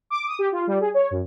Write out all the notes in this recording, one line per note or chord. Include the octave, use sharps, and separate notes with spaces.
D6
D#6
G4
F4
G3
G#4
C#5
F#2